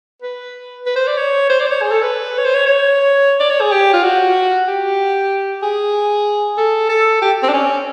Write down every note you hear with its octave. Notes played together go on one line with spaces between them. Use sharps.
B4
B4
C5
D5
C#5
C5
D5
C5
C#5
G#4
A4
B4
C#5
C5
C#5
C#5
D5
C#5
G#4
G4
F4
F#4
G4
G#4
A4
A4
G4
C4
D4
C#4